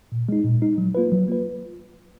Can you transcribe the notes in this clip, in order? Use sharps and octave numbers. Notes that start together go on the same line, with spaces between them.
A#2
G#3 D#4
A#2
G#3 D#4
F#3
A#3 F4 B4
F#3
A#3 F4 B4